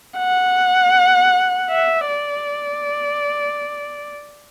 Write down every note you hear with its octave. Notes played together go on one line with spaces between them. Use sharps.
F#5
E5
D5